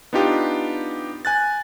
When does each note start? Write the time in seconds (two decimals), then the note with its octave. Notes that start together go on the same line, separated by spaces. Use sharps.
0.13 B3 D4 D#4 F4 G4
1.25 G#5 F#6 A6